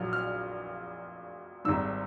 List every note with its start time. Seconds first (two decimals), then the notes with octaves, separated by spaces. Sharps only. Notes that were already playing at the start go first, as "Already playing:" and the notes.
Already playing: A#1 A#2 F#3 F6
0.13 F6
1.65 G#1 G#2 D#3 G3 E6